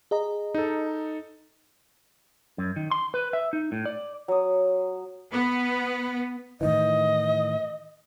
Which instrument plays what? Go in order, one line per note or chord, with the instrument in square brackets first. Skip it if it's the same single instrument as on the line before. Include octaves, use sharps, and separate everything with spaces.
[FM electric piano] G#4 D#5 A#5
[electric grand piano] D#4 A4
[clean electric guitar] F#2
D#3
C6
B4
E5
D#4
A2
D5
[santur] F#3 D#6
[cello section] B3
[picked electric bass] A2 D#3 E3 [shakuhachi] D#5